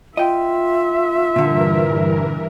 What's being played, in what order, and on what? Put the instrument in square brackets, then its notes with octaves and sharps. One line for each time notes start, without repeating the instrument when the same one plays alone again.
[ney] F4 [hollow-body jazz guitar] D#5 G5 [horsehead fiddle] E5
[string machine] G2 E3 A#4 [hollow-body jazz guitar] A#2 D3